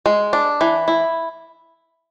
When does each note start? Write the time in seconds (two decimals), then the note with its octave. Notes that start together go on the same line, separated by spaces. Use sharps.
0.06 G#3
0.33 D4
0.61 E3
0.88 E4